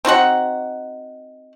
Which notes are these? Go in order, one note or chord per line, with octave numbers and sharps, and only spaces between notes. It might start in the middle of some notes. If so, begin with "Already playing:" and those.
C4 D#4 F#4 F#5